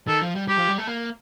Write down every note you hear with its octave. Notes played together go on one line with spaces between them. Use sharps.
D#3 A4
F3
G3
G3 G4
F3
G3
A3
A#3